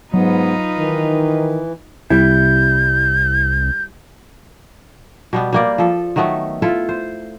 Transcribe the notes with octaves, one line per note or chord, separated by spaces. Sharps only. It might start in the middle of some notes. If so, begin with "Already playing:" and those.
G#2 F#3 B3 D#4 F4 B4
D#3 E3
C2 G3 E4 G6
B2 G3 B3
G3 A#3 D5
F3 A4
D#3 F#3 A3 B3
E4 F4 A4
C5